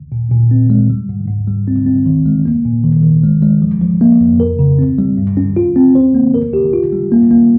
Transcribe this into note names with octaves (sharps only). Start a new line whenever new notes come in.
A#2
A#2
C4
G#3
G3
G#2
G#2
G3
C4
C4
D#3
G#3
A#3
A#2
D#3
D#3
G#3
G#3
F3
F3
A#3
F2
A#4
C#3
C4
G3
G2
C#4
F4
C4
C5
A#3
A#4
G4
F4
G3
A#3
A#3